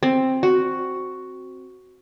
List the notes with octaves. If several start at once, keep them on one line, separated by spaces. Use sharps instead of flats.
C4
F#4